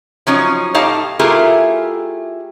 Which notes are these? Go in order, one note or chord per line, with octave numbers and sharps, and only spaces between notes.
F3 F#3 C#4 D#4
A2 D#4 G4 F5 A5
A3 E4 F4 G4 G#4 A#4